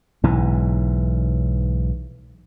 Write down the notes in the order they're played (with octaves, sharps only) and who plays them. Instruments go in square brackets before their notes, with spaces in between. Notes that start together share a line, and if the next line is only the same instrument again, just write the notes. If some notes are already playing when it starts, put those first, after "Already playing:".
[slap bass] B1 G#2 E3